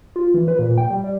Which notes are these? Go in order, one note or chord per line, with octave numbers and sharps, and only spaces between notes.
F4
E3
B4
A#2
G5
G3
G3